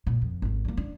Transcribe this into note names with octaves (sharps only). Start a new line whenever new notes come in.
A#2
F2
G#1 D#2
G3 A#3
D4